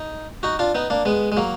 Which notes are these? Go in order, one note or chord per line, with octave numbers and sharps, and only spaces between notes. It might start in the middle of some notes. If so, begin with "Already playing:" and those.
Already playing: D#4
D#4 F#4
D4 F4
B3 D#4
A#3 D4
G#3 B3
G#3
F#3 A#3